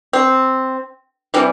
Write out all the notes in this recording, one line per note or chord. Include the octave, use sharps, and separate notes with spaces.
C4
C3 E3 G3